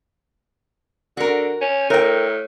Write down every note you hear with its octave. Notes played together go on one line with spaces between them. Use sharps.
D3 F#4 A#4
C#4
A2 A#4 G5